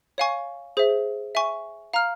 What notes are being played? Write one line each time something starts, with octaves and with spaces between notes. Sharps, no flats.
C#5 F5 G#5 C#6
G#4 C5 E5
E5 G#5 C#6
F5 A#5 F6